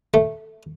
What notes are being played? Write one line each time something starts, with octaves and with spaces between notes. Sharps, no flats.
A3